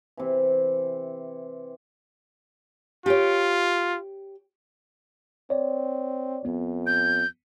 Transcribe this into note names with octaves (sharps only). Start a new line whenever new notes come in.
C3 E3
F4 G4 C#5
C4 C#5 D5
F2 B3
G6